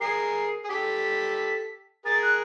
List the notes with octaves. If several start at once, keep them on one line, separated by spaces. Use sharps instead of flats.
G#4 A#4 C7
G#4
G4 A4 B6
G#4 A#4 A6
F#6